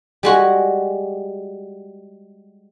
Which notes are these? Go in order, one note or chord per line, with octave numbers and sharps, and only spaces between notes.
G3 G#3 F#4